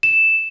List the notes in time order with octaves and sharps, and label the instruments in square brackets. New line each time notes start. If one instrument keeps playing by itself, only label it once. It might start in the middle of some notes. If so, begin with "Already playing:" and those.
[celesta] E7